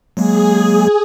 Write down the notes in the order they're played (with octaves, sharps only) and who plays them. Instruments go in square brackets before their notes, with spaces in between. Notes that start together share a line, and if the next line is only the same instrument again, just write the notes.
[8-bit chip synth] F#3 G#3 A#3 [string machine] G#4